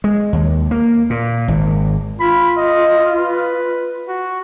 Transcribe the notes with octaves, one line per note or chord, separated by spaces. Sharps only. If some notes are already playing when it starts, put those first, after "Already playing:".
G#3
D#2
A#3
A#2
G#1
F4 B5
D#5
B4
F#4